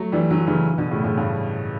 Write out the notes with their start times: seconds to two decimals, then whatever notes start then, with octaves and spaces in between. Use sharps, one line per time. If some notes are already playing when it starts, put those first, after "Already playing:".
Already playing: F#3 A3
0.12 E3 G3
0.30 D3 F#3
0.47 C#3 E3
0.78 B2 D3
0.91 A2 C#3
1.04 A2 C#3
1.17 G2